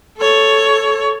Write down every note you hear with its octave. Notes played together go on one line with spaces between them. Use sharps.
A4 C#5